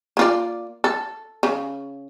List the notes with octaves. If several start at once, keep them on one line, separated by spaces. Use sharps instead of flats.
A#3 F4 D5
A4
C#3